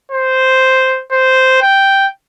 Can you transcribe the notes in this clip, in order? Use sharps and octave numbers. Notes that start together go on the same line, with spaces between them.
C5
C5
G5